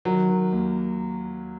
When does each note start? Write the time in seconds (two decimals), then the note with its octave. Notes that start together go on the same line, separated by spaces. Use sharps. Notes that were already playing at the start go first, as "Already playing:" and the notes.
0.05 D#3 F#3
0.29 D#3
0.52 D#2